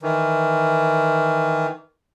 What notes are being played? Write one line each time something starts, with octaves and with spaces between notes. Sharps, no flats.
D#3 E3